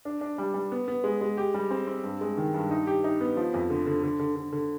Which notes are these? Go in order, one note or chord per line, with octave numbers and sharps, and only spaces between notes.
D4
D4
G3
G3
B3
B3
G#3
G#3
G4
G3
C4
C4
G2
G#3
D#3
G2
D#4
G4
D#4
B3
F3
F2
D3
D3
D3
D3
D3
D3